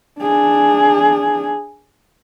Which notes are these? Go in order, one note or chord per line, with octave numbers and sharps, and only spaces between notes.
D4 G#4